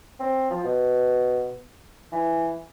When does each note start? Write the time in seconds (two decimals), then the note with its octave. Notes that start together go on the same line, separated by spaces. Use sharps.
0.20 C4
0.50 F3
0.64 B2
2.12 E3